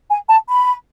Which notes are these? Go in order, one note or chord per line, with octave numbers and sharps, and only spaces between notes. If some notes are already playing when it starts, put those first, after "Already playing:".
G#5
A5
B5